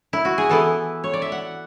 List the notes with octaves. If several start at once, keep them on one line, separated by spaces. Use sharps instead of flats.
E4
F#4
G#4
E3 B3 E4 A4
C#5
D5
E5
F#5